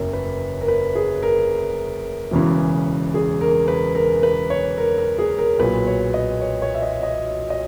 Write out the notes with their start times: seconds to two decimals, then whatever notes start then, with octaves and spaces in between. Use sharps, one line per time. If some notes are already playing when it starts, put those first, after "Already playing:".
Already playing: F#1 E2 C#3 E3 A#4 C#5
0.13 B4
0.61 A#4
0.68 B4
0.95 G#4
1.23 A#4
2.31 E1 E2 C#3 E3
3.14 G#4
3.41 A#4
3.68 B4
3.95 A#4
4.23 B4
4.50 C#5
4.78 A#4
4.98 A#4
5.19 G#4
5.39 A#4
5.59 B1 A#2 B4
5.87 C#5
6.14 D#5
6.42 C#5
6.62 C#5
6.75 E5
6.82 D#5
7.03 D#5
7.50 D#5